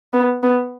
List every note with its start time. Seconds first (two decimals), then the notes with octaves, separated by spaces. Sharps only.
0.13 B3
0.43 B3